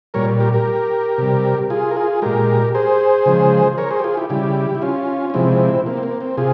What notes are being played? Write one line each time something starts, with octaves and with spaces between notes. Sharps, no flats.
A#2 G3 A#4 C#5
G4 A#4
G4 A#4
C3 G3
F4 G#4
A#4
F4 G#4
A#2 G#3 G4 A#4
G#4 C5
C#3 F3 G#3
A#4 C#5
G#4 C5
G4
F4 G#4
E4 G4
C#3 G3 E4 G4
E4
C#4 F4
C#4
C3 F3 G#3 C4 E4
A#3
C4
A#3
C4
C3 F4 G#4